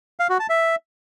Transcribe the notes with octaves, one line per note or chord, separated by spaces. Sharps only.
F5
F#4
A5
E5